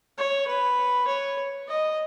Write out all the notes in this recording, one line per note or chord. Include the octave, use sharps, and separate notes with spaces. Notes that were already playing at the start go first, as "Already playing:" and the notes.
C#5
B4
C#5
D#5